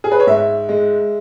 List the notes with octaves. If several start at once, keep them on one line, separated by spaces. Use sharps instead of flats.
G#4
B4
C#5
G#2 E5
G#3